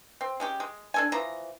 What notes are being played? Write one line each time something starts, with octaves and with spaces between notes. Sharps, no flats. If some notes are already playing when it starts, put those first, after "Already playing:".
C4
G#3 C#4 G4
G#3
D4 A4 G#5
E3 F3 A#5